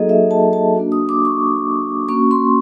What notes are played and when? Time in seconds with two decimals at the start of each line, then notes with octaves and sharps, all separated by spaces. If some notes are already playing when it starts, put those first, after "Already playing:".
Already playing: F#3 A#3 D#4 F#4 G#4 A4 D#5
0.09 E5
0.31 A5
0.53 A5
0.75 A#3 D4 F#4
0.92 D#6
1.09 D6
1.25 C#6
2.09 A#3 C#4 F#4 C#6
2.31 C6